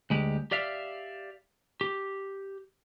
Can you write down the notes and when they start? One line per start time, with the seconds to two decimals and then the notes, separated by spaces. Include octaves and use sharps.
0.10 D2 G#3 G4
0.51 G4 D5 E5 F5
1.81 G4